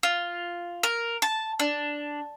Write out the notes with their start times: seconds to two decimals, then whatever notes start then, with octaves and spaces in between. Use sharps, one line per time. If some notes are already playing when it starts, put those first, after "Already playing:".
0.03 F4
0.83 A#4
1.22 A5
1.60 D4